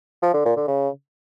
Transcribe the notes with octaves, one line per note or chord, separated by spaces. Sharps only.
F3
D3
A#2
D3
C#3